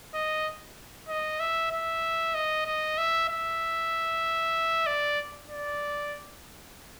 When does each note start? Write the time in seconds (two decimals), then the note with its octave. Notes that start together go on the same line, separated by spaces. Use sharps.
0.14 D#5
1.09 D#5
1.40 E5
1.72 E5
2.34 D#5
2.66 D#5
2.98 E5
3.29 E5
4.87 D5
5.49 D5